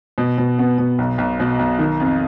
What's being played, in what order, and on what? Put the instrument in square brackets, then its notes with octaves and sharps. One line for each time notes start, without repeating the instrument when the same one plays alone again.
[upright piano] B2
B2
B3
B2
B1
B1
B2
B1
D#3
F2